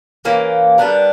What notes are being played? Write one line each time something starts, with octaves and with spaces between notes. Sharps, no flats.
E3 A#3 C#4 G4
G3 B3 D4 A#4